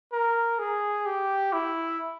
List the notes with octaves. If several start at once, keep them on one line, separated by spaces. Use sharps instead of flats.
A#4
G#4
G4
E4